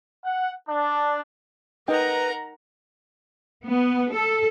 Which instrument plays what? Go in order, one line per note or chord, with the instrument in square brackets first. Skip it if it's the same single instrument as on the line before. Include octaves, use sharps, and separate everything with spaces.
[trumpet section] F#5
D4
[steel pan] D#4 D#5 G5 [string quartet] A#4 F#5 A#5 [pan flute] B4
[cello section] B3
A4